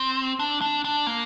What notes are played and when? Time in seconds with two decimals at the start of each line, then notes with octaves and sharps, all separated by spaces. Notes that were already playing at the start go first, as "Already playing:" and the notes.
Already playing: C4
0.39 D4
0.61 D4
0.85 D4
1.07 A#3